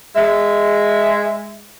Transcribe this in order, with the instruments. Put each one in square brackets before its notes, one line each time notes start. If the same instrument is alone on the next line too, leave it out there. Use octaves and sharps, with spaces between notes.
[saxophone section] G#3 E5